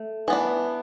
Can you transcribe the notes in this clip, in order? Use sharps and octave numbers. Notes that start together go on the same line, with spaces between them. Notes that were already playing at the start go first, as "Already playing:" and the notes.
Already playing: A3
E3 B3 D4